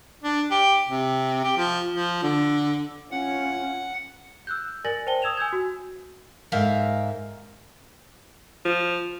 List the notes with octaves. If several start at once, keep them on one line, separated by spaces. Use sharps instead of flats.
D4
G4
C3
G4
F3
F3
D3
C#4 F4 F#5
E6 F#6 G6
A#4 D5 G#5 A6 A#6 F#7
C5 G5 A5 G7
D#6 E6 G#6 E7 F7
G#5 E6 G6 G#6
F#4
G#2 A#4 E5 F5
F3